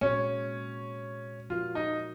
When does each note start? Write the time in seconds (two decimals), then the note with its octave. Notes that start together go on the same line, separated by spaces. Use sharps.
0.01 A#2 G#3 C4 C#4 F#4 C#5
1.50 F3 C4 F4 F#4 A#4
1.75 D#4